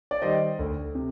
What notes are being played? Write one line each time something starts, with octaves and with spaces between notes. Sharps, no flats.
D5
D#3 G3 C5 D#5
D2
C3